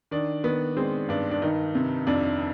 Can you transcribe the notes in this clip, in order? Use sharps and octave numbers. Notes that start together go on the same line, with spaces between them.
D#3 D4
D#3 B3
G#3 C4
G2 D4
D4
D#3 D#4
C3
F2 D4